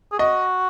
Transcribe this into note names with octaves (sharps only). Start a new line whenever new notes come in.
G#4
F#4 D#5